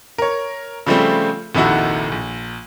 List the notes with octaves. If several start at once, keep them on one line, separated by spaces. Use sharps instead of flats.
A#4 C#5
C#3 F3 G3 A3 C4
F1 A#1 C3 D#3 E4 F#4
A#1